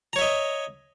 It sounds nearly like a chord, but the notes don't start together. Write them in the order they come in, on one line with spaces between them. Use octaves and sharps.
A#5 C#5 E5 D#5